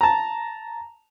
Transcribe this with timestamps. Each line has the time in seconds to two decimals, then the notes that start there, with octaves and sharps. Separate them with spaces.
0.01 A5 A#5